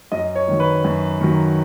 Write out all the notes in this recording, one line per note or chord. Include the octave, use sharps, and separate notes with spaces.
F#2 D#5
C#5
D#3 F#3
B4
F#2
D#3 F#3